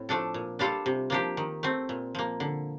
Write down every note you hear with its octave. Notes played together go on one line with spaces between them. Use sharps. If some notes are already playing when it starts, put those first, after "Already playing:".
Already playing: A2 C4
F3 A3 D4 A4
A#2
G3 D4 F4 A4
C3
F3 A#3 D4 G4
D#3
A3 C4
A#2
F3 A#3
D3